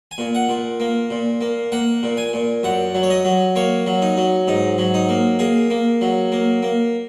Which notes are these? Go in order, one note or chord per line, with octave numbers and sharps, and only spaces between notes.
G#5
A#2
F#5
A#2
A#3
A#2
A#3
A#3 F#5
A#2
G#5
A#2
F#2 F#5
F#3
C#5
D#5
F#3
A#3 C#5
F#3
D#4
F#3
G#2 D#4
F#3
D#4
A#3
A#3 G#4
A#3
F#3
A#3
A#3